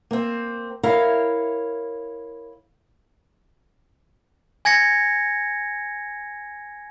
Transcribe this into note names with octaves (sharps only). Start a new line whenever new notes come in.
A#3 C4
E4 A#4 C#5 F5
G#5 G#6 A#6 C#7